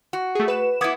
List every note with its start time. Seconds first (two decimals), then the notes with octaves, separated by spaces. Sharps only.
0.13 F#4
0.35 A3 G#4
0.48 B4 E7
0.81 B3 E4 D6 D#6 G#6